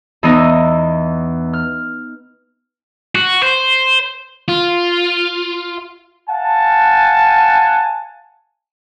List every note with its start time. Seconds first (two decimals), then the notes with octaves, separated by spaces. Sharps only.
0.23 E2 E3 B3 D#4 D#5
1.53 F6
3.15 F#4
3.43 C5
4.48 F4
6.29 F5 F#5 G#5 A5